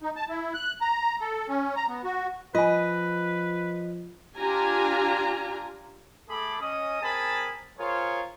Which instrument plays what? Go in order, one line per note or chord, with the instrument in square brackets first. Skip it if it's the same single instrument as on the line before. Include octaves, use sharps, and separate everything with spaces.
[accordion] D#4
A5
E4
F#6
A#5
A4
C#4
A#5
B3
F#4
[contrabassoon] F3 [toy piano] F4 G#5 [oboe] B4 [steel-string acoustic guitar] D#5
[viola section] D4 F4 G4 G#5 A#5
[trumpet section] A3 G#4 A4 B5 D6
C#4 D#5 D#6
C4 G#4 A#4 G#5 A5 B5
F4 G#4 A#4 C5 C#5